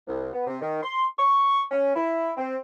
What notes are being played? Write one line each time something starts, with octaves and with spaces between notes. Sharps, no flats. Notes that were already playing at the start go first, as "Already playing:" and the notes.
C2
B3
C3
D#3
C6
C#6
C#4
E4
C4